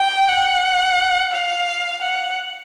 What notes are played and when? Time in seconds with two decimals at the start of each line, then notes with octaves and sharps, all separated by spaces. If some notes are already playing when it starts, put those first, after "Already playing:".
Already playing: G5
0.29 F#5
1.32 F5
2.02 F#5